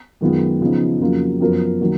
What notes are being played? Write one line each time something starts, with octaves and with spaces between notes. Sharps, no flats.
F#2 D#3 G#3 B3 F4
C#3 F3 B3 D#4
F2 C#3 F#3 A#3 F4
F#2 F3 B3 F#4 A#4
D#3 F#3 A#3